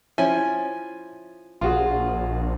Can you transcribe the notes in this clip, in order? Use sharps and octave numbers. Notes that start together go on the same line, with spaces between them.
F3 C#4 E4 G#5
A#1 F4 F#4 G#4